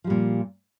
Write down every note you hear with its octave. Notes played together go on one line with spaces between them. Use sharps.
A#2 F3 G3